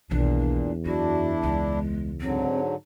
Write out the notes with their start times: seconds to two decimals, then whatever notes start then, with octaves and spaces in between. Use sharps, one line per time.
0.11 B1 E2 A#2 D#3 D4
0.85 F#2 D4 E4 F#4
1.43 C#2 G#3
2.21 G#2 D3 F#3 C4